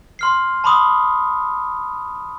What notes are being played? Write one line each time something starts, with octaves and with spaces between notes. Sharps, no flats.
C6 F6 C7
A5 B5 C6 D6 D#6